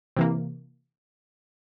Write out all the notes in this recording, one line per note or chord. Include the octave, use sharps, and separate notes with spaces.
C3 E3 A#3